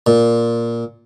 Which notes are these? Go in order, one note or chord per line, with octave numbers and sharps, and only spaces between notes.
A#2